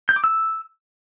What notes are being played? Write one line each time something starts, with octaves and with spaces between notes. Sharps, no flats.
G6
D6
E6